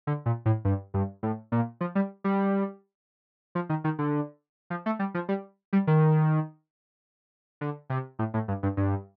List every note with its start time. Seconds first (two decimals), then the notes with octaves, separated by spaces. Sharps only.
0.07 D3
0.26 A#2
0.46 A2
0.65 G2
0.94 G2
1.23 A2
1.52 A#2
1.81 F3
1.95 G3
2.24 G3
3.55 F3
3.69 D#3
3.84 D#3
3.99 D3
4.70 F3
4.86 A3
4.99 G3
5.14 F3
5.29 G3
5.73 G3
5.87 D#3
7.61 D3
7.90 C3
8.19 A2
8.34 A2
8.48 G2
8.63 G2
8.77 G2